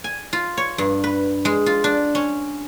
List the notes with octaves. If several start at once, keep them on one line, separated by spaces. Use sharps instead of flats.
G#5
F4
C#5
G2
B4
G#3
F4
D4
C#4